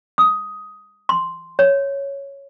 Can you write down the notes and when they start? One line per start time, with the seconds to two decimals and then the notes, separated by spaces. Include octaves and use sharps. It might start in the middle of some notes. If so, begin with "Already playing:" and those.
0.18 D#6
1.09 C6
1.59 C#5